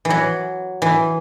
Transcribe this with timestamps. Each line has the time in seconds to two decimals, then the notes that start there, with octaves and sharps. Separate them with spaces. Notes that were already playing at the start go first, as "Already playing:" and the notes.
0.05 E3
0.10 F#3
0.82 E3